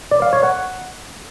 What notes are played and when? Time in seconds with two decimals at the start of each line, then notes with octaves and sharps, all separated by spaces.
0.11 D5
0.22 F5
0.33 C#5
0.43 F#5